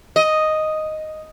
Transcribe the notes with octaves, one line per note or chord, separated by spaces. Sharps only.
D#5